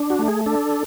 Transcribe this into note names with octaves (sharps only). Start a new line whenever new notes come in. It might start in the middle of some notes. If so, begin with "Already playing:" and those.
Already playing: D4
F#4
A3
G#4
D4 A4